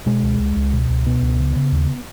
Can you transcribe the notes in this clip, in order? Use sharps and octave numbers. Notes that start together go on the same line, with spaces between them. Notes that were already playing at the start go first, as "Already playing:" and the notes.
B2 G#3
C#2
C#2
C#2
B2
C#2
B2 B3
C#2
C#3
C#3
D#2